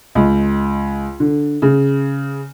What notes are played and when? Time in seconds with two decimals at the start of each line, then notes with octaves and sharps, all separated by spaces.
0.15 C#2
1.20 D3
1.62 C#3